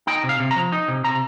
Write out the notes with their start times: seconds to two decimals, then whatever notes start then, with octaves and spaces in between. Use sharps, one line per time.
0.07 D#4 G5
0.24 C3
0.29 F5
0.40 C3
0.51 A#5
0.56 F3
0.72 D#4
0.88 C3
1.04 C3 A#5